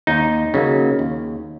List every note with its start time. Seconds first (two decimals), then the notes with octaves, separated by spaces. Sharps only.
0.07 D#2 D#4
0.54 C#3 F#3 A#3
0.99 D#2